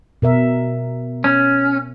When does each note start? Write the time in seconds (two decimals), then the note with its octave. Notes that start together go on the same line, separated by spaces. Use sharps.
0.22 B2 A#4 E5
1.24 C#4